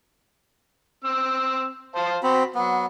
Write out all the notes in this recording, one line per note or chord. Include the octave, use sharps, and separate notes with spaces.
C4 E6
C5 F5 A5
C4 F#4 B5
F#3 B3